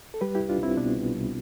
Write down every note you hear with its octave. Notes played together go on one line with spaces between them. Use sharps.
A4
G3 G4 B4
C2 E4 G4
D4 F4
C2 C4 E4
B2 B3 D4
C2
C2